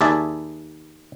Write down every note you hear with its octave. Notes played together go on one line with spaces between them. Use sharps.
D#2 G#4 D5 E5 A5